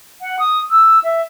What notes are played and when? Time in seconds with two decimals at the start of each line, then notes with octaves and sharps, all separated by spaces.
0.21 F#5
0.39 D#6
0.71 E6
1.04 E5